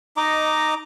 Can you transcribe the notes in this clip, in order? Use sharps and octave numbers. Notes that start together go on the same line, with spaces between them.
D#4 D#5 A#5 D6